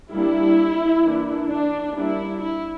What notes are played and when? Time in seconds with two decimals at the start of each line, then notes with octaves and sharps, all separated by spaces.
0.12 G3 A#3 D4 E4
1.04 E3 A#3 D4
1.50 D4
1.96 G3 A#3 D4 E4
2.42 E4